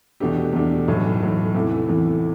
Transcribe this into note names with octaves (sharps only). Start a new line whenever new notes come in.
E2 B2 A3 D4 G4
E2 B2 A3 D4 G4
B1 A2 E3
B1 A2 E3
E2 C3 E3 A3
E2 C3 E3 A3